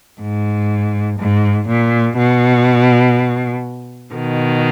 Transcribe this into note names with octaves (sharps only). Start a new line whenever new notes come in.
G#2
G#2
A#2
B2
B2 D#3